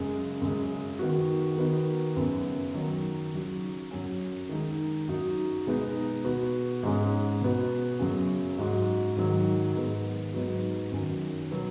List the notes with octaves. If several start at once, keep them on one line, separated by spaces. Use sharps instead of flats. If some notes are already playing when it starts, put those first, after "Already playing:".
Already playing: F#2 C#3 G#3
F#2 C#3 G#3
D#3 B3 F#4
D#3 B3 D#4 F#4
F#2 C#3 B3
D#3 F#3 D#4
C#3 F#3 D#4 F#4
F#2 F#3 C#4
D#3 G#3 D#4
F#2 F#3 D#4 F#4
B2 G#3 B3 D#4
B2 B3 F#4
G#2 G#3 C#4
B2 B3 F#4
F#2 C#3 F#3 C#4
G#2 F#3 C#4 F#4
G#2 D#3 F#3
G#2 D#3 G#3 B3
G#2 F#3 B3 D#4 F#4
F#2 D#3 F#3 C#4 F#4
B2 F#3 B3